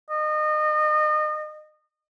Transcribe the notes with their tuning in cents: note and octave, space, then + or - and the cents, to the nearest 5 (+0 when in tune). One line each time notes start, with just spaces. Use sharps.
D#5 -30